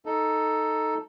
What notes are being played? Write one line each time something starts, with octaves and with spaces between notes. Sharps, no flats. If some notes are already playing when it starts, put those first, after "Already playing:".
D#4 A4